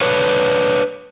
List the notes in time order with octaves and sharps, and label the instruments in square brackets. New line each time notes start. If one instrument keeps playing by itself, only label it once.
[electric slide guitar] D4 B4 C#5